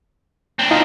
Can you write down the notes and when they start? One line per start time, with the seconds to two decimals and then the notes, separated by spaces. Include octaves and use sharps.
0.59 C4 D4
0.71 D#4 F4